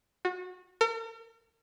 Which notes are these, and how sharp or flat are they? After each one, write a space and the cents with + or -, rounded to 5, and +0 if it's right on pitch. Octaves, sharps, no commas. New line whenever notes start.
F#4 -30
A#4 -45